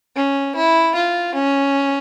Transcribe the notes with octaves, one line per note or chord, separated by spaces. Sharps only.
C#4
E4
F4
C#4